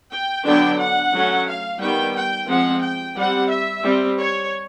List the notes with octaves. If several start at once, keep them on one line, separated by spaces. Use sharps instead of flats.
G5
D3 F#3 B3 D4 G5
F#5
F#3 A3 C#4
F5
D#3 G3 B3 G5
G5
F3 G#3 C4 F#5
G5
G3 C4 F#5
E5
G3 C4
C#5